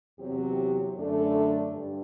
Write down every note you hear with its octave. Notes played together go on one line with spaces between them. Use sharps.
E2 C3 F#3 C4 G4
F#2 D3 A3 D4 A4
G2